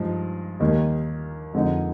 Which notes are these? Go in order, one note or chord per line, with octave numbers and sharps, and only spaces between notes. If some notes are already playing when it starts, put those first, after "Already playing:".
Already playing: G2 F3 G#3 D#4
D#2 D#3 G3 A#3 D#4
F2 D3 G#3 C4 D#4